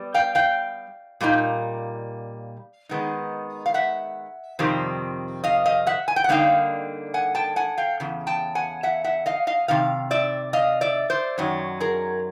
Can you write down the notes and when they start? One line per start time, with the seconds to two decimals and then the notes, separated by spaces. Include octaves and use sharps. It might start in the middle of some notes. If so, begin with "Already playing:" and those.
Already playing: G3 B3
0.14 F5 G5
0.35 F5 G5
1.21 A#2 G3 A#3 D#4
2.89 D#3 G#3 B3 D#4
3.66 F5
3.74 E5 F#5
4.59 F2 C3 D#3 G3 C4
5.44 D#5 F5
5.66 D#5 F5
5.87 E5 F#5
6.08 G#5
6.16 G5
6.24 F#5
6.29 D3 G3 A#3 D#4 F5 G5
7.14 F#5 G#5
7.35 G5 A5
7.56 F#5 G#5
7.78 F5 G5
8.00 E2 C#3
8.27 G5 A5
8.55 F#5 G#5
8.83 E5 F#5
9.04 E5 F#5
9.26 D#5 F5
9.47 D#5 F5
9.68 C3 D#3 F5
10.11 D5 E5
10.53 D#5 F5
10.81 D5 E5
11.10 C5 D5
11.38 F#2 D#3 F#3 C#5
11.80 G#4 A#4